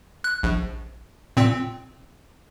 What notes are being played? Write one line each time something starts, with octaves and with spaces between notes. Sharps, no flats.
F#6
A#1
A#2 C4